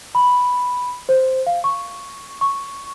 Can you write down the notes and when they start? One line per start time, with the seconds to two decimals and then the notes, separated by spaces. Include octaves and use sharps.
0.15 B5
1.09 C5
1.47 F5
1.64 C#6
2.41 C#6